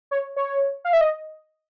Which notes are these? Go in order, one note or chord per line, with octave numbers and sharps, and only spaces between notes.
C#5
C#5
F5
E5
D#5